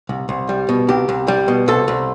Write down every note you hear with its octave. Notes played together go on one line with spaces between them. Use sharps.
C2
C2
G3
B2
C2 G4
C2
G3
B2
C2 A4
C2